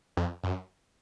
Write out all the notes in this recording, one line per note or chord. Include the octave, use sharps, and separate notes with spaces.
F2
F#2